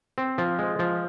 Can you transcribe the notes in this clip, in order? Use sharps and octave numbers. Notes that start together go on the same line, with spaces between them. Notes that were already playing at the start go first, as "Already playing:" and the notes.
C4
F3
G#3
F3